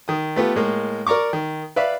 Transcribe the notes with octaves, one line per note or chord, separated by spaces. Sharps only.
D#3 D#6
A3 B3 F4 G4
A2 G#3 A#3
A#4 D5 A#5 C#6 D6
D#3
B4 D5 E5 F5 B5